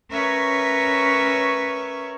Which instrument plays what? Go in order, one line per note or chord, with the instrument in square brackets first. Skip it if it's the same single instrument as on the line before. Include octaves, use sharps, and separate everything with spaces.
[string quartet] C#4 A#4 B4 C#5 E5 C#6